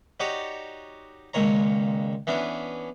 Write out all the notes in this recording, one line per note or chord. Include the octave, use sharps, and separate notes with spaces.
D#4 F#4 G4 C#5 D5
C#2 A#2 D#3 C#5 A#5
E3 B3 C#4 D4